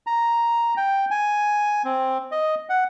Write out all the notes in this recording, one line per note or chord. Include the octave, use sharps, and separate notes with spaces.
A#5
G5
G#5
C4
D#5
F#5